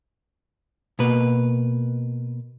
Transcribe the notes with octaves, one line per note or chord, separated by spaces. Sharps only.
B2 A#3 B4